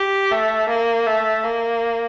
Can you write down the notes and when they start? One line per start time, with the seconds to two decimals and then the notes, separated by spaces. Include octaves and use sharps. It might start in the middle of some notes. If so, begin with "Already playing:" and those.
Already playing: G4
0.32 A3
0.69 A#3
1.07 A3
1.44 A#3